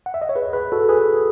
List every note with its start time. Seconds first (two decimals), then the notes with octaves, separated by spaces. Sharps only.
0.06 F#5
0.14 E5
0.22 D#5
0.29 C#5
0.36 G#4 B4
0.53 G#4 B4
0.72 F#4 A4
0.89 G#4 B4